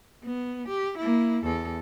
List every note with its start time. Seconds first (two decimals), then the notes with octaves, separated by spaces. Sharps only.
0.24 B3
0.68 G4
0.98 A#3 E4
1.45 E2 A4